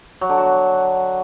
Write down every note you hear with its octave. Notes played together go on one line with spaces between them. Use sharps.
F#3
D3
F#4